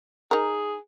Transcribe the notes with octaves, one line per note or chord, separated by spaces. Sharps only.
D#4 G#4 A#4